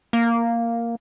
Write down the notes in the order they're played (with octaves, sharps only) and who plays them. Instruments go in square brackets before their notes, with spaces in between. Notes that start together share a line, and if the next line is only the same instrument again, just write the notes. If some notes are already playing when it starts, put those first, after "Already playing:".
[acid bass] A#3